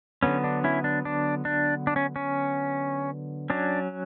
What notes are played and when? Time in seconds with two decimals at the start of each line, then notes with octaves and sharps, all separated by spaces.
0.23 D3 F#3 B3 C#4
0.44 D4
0.64 C#4 E4
0.84 D4
1.05 D4
1.45 D4
1.87 D4
1.96 C#4
2.16 C#4
3.50 F#3 C#4 D4